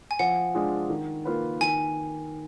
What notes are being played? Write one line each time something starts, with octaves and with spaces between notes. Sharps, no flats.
G#5
F3 F#5
G#3 D4 F4 G#4
D#3
A#3 F4 B4
D#3 G#5